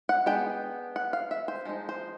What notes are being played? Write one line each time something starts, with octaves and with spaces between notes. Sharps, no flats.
F#5
G#3 B3 D4 G5
F#5
F5
E5
C5
F3 G#3 D#4
C5